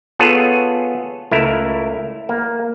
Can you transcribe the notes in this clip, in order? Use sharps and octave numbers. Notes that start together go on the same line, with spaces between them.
B3 F4 G#4 A4 C#5
C#2 A3 E4 A#4
A#3